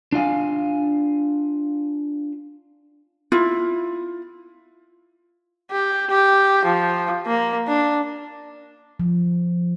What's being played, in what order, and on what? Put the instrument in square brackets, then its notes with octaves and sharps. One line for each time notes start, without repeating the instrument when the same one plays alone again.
[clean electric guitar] D4 F4 F5 G#5
[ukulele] E4 F4
[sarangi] G4
G4
F3
A#3
D4
[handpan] F3